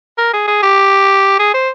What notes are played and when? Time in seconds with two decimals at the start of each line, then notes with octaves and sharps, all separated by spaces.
0.18 A#4
0.33 G#4
0.48 G#4
0.63 G4
1.39 G#4
1.54 C5